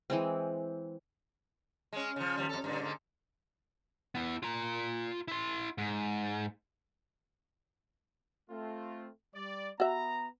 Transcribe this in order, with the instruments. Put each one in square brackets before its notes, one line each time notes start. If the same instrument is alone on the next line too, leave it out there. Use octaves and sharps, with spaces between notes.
[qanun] E3 G#3 C4
[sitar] G#3 C#4
C#3 F3
D#2 F3 G3
F2 A4
G2 A#2 D3
G#2 D3 A#3
[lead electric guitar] B3 E4
F4 A#5
E4 C6
G#2
[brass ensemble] A3 C4 F4
G3 D5
[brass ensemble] B3 A#5 [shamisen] F#4 E5